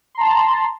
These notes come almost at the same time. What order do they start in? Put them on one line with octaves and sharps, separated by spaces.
C6 A#5 A5